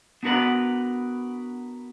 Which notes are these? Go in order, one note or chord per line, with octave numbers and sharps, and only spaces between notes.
B3 D4 F#4 A#4 B4 F#5